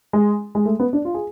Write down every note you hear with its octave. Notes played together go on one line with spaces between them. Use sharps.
G#3
G#3
A3
B3
D4
F4
G#4